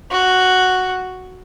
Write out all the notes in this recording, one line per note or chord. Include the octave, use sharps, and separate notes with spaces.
F#4